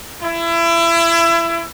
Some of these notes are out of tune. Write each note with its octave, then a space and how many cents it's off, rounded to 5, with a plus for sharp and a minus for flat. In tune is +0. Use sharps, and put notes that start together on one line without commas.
E4 +30